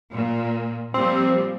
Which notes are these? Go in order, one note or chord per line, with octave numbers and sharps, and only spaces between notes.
A#2
A#2 F3 G3 C4